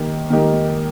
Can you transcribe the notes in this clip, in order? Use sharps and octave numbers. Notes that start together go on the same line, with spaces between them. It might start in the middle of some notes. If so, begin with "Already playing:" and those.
Already playing: D#3 A#3 G4
D#3 A#3 D#4 G4 A#4